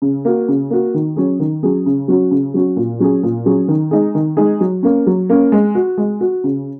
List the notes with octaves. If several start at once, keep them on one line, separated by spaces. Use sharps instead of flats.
C#3
A#3 F#4
C#3
A#3 F#4
D#3
F#3 C#4 G#4
D#3
F#3 C#4 G#4
C#3
F#3 C#4 F#4
C#3
F#3 C#4 F#4
A#2
F#3 C#4 G#4
A#2
F#3 C#4 G#4
D#3
G#3 D#4 G#4
D#3
G#3 D#4 G#4
F#3
A#3 C#4
F#3
A#3 C#4
G#3
F#4
G#3
F#4
C#3